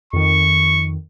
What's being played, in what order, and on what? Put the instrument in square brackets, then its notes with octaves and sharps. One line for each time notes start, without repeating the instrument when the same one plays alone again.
[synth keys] F2 D#3 [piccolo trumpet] C#6